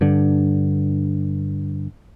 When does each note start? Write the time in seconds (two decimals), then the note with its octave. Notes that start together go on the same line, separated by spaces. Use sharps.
0.01 G2 D3